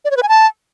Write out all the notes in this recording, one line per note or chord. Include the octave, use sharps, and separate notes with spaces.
D5
C#5
B4
G#5
A5